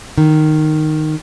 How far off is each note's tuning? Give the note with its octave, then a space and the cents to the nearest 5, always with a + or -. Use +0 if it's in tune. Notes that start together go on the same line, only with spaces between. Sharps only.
D#3 -10